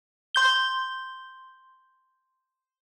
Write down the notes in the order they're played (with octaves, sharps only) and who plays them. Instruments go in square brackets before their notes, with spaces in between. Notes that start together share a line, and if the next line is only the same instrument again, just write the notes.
[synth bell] C6 G6 G7